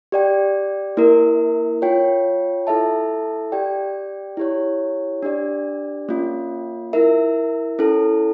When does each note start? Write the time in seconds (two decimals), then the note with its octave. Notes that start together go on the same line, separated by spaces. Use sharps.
0.12 G4 D5 G5
0.97 A#3 E4 A#4
1.82 F4 C#5 G5
2.67 E4 A4 E5 A5
3.52 G4 D5 G5
4.37 E4 G4 C#5
5.22 D4 G4 D5
6.09 A#3 C#4 F4
6.93 E4 A#4 E5
7.79 C#4 E4 A4